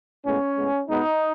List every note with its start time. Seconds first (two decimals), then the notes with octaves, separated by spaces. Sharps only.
0.25 A2 G#3 B3 C#4
0.57 A2 G#3 B3
0.88 B2 G#3 B3 D#4